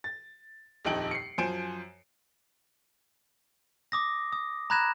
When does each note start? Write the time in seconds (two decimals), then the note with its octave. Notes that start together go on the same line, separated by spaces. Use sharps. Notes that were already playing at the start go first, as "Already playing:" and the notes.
0.04 A6
0.85 D#1 A#1 F2 D#4 D7 F#7
1.11 C7 C#7
1.38 F#2 F3 C5 G#5 D7 E7
3.92 D6 D#6 A#6
4.33 D#6
4.70 A#5 B5 F#6 G#6 A#6 E7